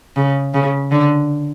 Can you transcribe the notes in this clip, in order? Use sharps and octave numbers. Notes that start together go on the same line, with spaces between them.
C#3
C#3
D3